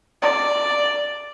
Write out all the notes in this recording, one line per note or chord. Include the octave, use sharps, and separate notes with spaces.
D5